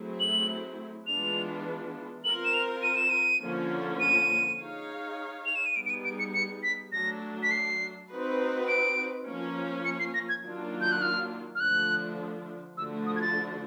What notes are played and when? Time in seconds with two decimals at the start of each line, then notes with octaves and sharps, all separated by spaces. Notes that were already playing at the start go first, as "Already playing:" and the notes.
Already playing: F#3 A3 C4 E4 G#4
0.20 F#7
1.07 E3 G#3 B3 D4 F4 F7
2.24 C4 F4 A#4 F#7
2.45 E7
2.54 F7
2.83 D#7
2.96 E7
3.10 D#7
3.41 D3 F3 A#3 C#4
4.00 D#7
4.59 D#4 G#4 C#5 F5
5.46 F7
5.55 E7
5.66 D#7
5.76 G3 B3 D#4 G#4 D7
5.86 D7
5.90 D#7
6.05 D7
6.19 C#7
6.34 C#7
6.63 B6
6.92 F#3 A3 D4 A#6
7.43 B6
7.51 C7
8.10 C4 D#4 F#4 B4
8.68 D7
9.26 F3 A#3 C#4
9.85 C#7
9.99 C7
10.14 A#6
10.29 G#6
10.44 D#3 F#3 A#3 D4 F4
10.81 G6
10.92 F#6
11.02 F6
11.55 F6
11.60 D3 F3 A3 D4 F#6
12.77 D3 F3 A3 D4 F#4 E6
13.06 D#6
13.16 G#6
13.22 A6